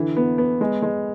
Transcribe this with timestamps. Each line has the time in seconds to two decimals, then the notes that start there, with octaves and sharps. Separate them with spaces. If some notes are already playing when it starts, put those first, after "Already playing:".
Already playing: D3 E3
0.17 B3
0.38 B3
0.61 G#3
0.82 G#3